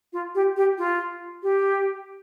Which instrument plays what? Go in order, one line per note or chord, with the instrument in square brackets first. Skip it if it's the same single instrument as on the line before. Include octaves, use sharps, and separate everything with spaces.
[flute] F4
G4
G4
F4
G4